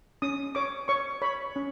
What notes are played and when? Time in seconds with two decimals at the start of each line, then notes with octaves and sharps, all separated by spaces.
0.22 C#4 D#6
0.55 C#5 D6
0.88 C#5 C#6
1.22 C#5 B5
1.56 C#4